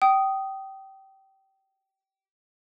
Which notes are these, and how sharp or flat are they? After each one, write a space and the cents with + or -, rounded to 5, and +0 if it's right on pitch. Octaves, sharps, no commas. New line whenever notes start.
G5 -25 D#6 +0